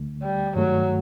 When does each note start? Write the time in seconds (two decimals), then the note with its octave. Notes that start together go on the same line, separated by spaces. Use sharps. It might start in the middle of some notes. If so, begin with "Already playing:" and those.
Already playing: D2 D3 A3
0.23 G3
0.56 G2 D#3 F#3 A3